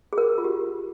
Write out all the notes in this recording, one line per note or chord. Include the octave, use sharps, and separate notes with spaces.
G#4
A#4
F4
G4